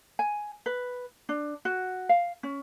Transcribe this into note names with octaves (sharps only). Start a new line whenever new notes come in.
G#5
B4
D4
F#4
F5
C#4